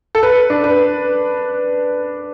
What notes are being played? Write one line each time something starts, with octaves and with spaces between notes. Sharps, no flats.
A4
B4
D4
B4